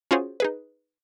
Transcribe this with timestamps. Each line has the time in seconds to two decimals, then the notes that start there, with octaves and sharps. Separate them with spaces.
0.11 C#4 F4 F#4 G#4 C5 C#5
0.40 D#4 G#4 B4